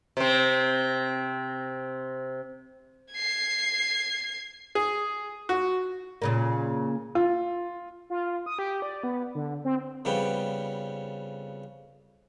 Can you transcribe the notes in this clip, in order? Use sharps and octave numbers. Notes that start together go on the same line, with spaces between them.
C3 C4
G#6 C7
G#4
F#4
A#2 C#3 A#3
F4
F4
D#6
G4
D5
B3
D3
C4
F2 C#3 G3 B3 G5